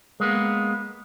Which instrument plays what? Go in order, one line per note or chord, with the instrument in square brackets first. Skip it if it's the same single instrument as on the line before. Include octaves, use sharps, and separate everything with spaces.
[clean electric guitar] G#3 A#3 B3